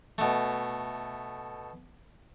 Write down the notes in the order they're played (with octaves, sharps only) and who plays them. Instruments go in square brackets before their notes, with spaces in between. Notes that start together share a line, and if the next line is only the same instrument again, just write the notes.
[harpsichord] B2 A3